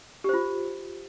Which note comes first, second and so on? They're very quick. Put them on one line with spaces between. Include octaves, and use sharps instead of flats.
G4 C5 F4